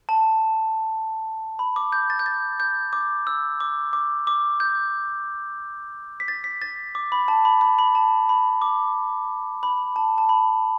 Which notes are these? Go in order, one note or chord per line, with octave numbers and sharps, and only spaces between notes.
A5
B5
D6
G6
A6
G6
A6
G6
D6
E6
D6
D6
D6
G6
B6
A6
B6
A6
D6
B5
A5
B5
B5
B5
A5
B5
D6
B5
A5
A5
B5